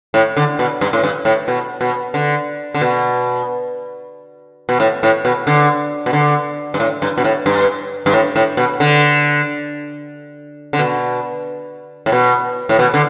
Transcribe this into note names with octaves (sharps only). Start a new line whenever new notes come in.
A2
D3
B2
G2
A2
G2
A2
B2
B2
D3
D3
B2
B2
A2
A2
B2
D3
B2
D3
G2
A2
G2
B2
A2
G2
G2
A2
A2
B2
D3
D3
B2
A2
B2
A2
B2
D3